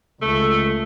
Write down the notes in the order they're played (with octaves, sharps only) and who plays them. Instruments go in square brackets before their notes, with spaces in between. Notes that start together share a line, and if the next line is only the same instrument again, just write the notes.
[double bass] C#2 [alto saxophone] A3